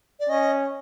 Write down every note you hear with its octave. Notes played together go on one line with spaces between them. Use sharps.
D5
C#4 D#5